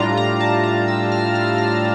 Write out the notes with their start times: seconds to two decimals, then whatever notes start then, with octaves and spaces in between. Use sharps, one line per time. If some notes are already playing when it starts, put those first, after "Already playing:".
Already playing: A2 G3 D4 F4 A#5
0.17 A#5
0.40 A5
0.64 A#5
0.88 E6
1.12 F6
1.35 F6
1.58 F6